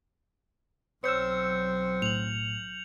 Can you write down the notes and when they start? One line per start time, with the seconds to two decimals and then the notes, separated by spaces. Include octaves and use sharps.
1.04 B1 F#3 C4 C#5 E6 F6 G6 C#7
2.02 A2 F7 F#7